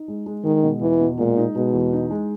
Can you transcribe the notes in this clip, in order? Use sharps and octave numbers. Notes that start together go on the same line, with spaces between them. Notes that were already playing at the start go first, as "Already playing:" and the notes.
Already playing: D#4
G#3
G#3
D#3 G#3
B2
E2 E3
B2
A#2 G#3
D#4
B2 G#3
E2
D#4
G#3